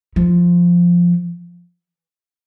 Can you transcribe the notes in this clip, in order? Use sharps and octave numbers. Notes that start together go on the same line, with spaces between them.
F3